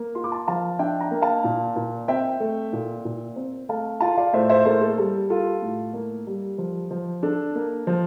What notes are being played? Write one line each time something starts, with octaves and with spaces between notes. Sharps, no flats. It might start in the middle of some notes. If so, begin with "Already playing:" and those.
Already playing: A#3
F4 C6
D6
A5 C6
F3 F5 A5
D4 E5 G5
G5 A#5
A#3
F5 A5
A#2
A#2
C4 E5 G5
A3
A#2
A#2
C4
A3 F5 A5
F4 F5 A5
D5 F5
A2 C5 E5
C5 E5
A#3 A4 C5
A4
G3 A4
F4 A4
A2
A#3
G3
F3
F3
D4 A4
A#3
F3